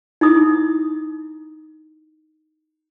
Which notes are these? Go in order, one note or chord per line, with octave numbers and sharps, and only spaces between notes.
D#4 E4 D#6